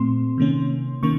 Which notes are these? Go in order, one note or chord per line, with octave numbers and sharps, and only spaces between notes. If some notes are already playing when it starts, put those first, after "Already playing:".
Already playing: A#2 A3 C4 C6
C3 D#3 A#3 C#4
C3 D#3 A#3 C#4 C#6